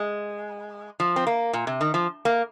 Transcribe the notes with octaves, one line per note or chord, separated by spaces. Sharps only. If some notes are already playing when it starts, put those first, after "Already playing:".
Already playing: G#3
F3
C4
A#3
A#2
C3
D#3
F3
A#3